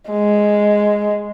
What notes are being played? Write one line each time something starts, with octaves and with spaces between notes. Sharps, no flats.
G#3